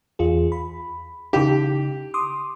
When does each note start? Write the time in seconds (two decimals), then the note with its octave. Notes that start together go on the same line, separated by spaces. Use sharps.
0.19 E2 F4 G#4
0.52 B5
1.33 C#3 D#4 G4
2.14 C6 D6 D#6